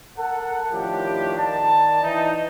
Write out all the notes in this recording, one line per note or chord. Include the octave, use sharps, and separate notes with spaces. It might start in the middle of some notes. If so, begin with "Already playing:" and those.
A4 A#4 F#5
A2 D#3 F3 D4 G4
D#3 D5 A5
E3 D#4